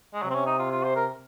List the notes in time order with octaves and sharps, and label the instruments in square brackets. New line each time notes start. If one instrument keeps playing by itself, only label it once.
[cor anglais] G#3
[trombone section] C3 [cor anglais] F#3
[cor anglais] C4
C#4
D#4
F4
F4
C5
A#4